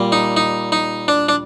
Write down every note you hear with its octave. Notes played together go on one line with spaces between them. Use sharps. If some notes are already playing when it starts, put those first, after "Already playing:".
Already playing: A#2 G3 A#3
D#4
D#4
D#4
D4
D4